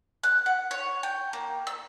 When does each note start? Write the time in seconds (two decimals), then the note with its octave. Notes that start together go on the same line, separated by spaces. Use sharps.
0.23 F#6
0.46 F#5
0.71 C#5
1.03 G5
1.33 A#3
1.67 E6